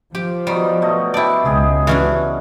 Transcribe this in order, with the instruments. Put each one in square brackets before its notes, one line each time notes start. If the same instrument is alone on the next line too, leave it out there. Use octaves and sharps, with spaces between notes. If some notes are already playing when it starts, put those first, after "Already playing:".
[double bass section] F3 [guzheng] G4
[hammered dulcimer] D#3 F#3 B3 [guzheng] G3
[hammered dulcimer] B2 A3 D#5
[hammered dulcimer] D4 G4 [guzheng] E4 D5
[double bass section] C#2 [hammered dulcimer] G4 G#4 D#5
[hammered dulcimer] G2 F#4 [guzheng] E3 C#4 D4